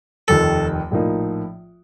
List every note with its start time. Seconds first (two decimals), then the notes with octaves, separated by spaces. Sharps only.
0.28 F1 D#2 D#3 A4
0.91 A#1 A2 F3 A#3 D#4